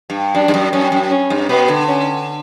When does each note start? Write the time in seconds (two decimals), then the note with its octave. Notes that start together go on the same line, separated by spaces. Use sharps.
0.10 G2
0.35 F#2 D4
0.48 G2
0.54 F#2
0.73 F#2 C#4
0.92 F#2
1.11 C#4
1.30 G2
1.49 B2 B3
1.68 D3
1.87 C#4